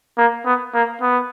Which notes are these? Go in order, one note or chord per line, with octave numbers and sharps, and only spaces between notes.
A#3
B3
A#3
B3